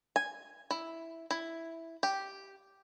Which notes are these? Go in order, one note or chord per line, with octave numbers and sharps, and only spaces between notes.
G#5
E4
E4
G4